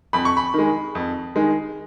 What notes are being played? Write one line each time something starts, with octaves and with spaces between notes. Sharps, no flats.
F2 B5
C#6
B5
D#3 G#3
F2
D#3 G#3